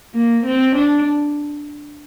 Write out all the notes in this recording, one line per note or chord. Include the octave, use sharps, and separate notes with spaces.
A#3
C4
D4